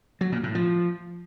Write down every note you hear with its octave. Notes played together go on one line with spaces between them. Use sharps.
F#3
A#2
A2
F3